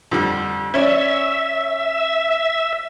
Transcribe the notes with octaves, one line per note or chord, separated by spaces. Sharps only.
F2 D3 G3
C#4 C#5 D5 E5